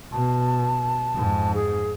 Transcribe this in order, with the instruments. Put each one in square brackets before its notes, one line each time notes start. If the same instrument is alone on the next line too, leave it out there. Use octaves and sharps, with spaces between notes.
[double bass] B2 [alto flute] A5
[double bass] F2 G#2
[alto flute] G#4